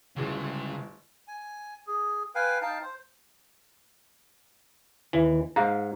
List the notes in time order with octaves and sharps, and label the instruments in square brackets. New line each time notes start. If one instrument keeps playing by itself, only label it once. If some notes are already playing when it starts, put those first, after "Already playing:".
[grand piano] D1 G1 [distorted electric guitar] C#3 G#3
[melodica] G#5
G#4
B4 F5 G5 G#5
D#4 F5 G5 A5
C5
[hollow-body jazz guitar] D#2 [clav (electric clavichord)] E3
[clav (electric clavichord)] G#2 [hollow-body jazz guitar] F5 A#5